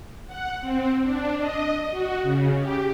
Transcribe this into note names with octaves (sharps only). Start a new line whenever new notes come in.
F#5
C4
D4
D#5
F#4
C#3
G4